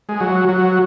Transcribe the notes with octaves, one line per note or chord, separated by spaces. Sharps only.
G#3
F#3
F#3